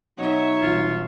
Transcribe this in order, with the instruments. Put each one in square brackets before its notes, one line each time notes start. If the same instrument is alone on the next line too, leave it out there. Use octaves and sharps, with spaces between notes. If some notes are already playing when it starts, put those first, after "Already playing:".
[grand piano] B2 D#5 [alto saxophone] F#3 [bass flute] D#4 [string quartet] C#5 E5
[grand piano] E1 C2 [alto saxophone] F4